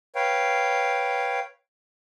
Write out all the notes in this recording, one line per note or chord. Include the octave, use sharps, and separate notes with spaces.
B4 C#5 F5 G5